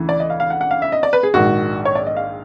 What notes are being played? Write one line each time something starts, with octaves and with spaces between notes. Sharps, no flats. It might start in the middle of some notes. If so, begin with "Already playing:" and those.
Already playing: D2 C#3 E3
D5
D#5
F5
F5
F#5
F#5
F5
E5
D#5
D5
B4
G#4
A#1 G#2 D#3 F#4
C#5
D5
D#5
F5